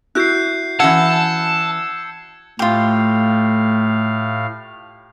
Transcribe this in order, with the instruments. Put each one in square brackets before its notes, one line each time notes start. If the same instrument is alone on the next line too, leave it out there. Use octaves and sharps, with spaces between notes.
[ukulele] E4 F#4 [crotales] F#6 G6 C7
[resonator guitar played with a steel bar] E3 C#4 F#5 [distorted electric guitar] A5 [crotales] E6 G#6 C#7
[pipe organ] A2 F5 [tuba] A3 [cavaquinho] F4 G4